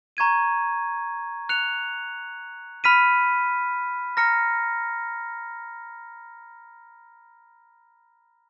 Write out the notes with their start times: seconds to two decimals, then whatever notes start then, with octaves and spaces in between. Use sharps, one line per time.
0.17 A#5 C#6 G#6 D#7
1.49 F#6 C#7 F7
2.84 B5 F6 B6 D#7
4.17 A#5 F6 A#6 C#7